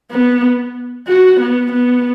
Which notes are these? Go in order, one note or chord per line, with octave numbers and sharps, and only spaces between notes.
B3
F#4
B3
B3